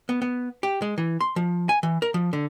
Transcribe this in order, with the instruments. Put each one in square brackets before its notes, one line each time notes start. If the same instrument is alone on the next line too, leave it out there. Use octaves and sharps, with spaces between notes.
[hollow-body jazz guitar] B3
B3
G4
G#3
E3
C6
F3
G#5
E3
A#4
F3
D3